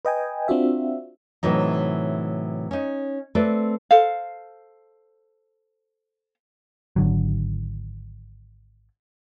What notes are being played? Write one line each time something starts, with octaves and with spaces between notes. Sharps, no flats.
B4 D#5 G5 G#5
C4 D4 F4 F#4 E5
A2 C3 E3 F#3 D#4
C#4 D#4
A3 C4 B4 D5
A4 C5 F5
G#1 D3 F#3